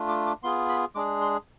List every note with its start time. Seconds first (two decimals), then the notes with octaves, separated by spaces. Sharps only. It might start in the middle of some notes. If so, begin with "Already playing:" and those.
Already playing: A3 D4 F4
0.09 D6
0.27 D6
0.43 B3 F4 G#4 C6
0.69 B5
0.95 G#3 D4 G#4 D6
1.21 C6